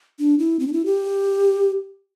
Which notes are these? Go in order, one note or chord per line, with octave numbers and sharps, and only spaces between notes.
D4
E4
C4
D4
E4
G4